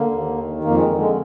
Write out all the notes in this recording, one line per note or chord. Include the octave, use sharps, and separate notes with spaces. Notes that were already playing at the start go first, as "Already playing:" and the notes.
Already playing: D3 A#3
D#2
D#3
F2 A#3
G#3
D3
G#3